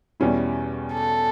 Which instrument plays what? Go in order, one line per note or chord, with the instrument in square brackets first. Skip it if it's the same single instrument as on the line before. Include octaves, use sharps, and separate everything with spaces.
[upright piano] E2 B2 G3 C#4 E4
[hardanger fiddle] A4